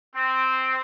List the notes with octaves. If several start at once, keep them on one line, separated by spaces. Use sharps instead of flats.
C4